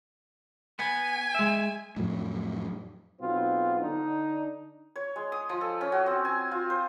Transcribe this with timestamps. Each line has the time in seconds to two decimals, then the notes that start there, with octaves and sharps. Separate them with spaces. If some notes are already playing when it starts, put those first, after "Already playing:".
0.79 B3 G#5
1.35 G#3 E5
1.96 F2 A2 F#3
3.20 B1 B3 C4 F4
3.79 D3 D4 D#4
4.96 C#5
5.16 G#3
5.32 D#6
5.49 F3
5.61 A4
5.81 C#4
5.92 F#4
6.06 C4
6.25 G#5
6.51 F4
6.70 C5